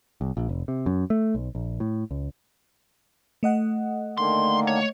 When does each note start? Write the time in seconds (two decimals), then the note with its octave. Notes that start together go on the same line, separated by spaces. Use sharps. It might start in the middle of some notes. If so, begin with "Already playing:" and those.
0.21 C2
0.37 A#1
0.49 F1
0.68 C3
0.86 F#2
1.10 A3
1.35 B1
1.55 A#1
1.80 A2
2.11 C#2
3.43 A3 D#5 F#5
4.18 D3 D#3 A#3 C6
4.67 C#5